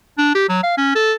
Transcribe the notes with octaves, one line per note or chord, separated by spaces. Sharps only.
D4
G4
F#3
F5
C#4
A4